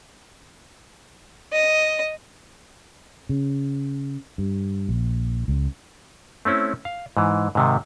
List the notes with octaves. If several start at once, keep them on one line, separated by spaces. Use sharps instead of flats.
D#5
C#3
G2
A#1
C#2
A3 C4 C#4 E4
F5
G#2 E3
G#2 C3 D#3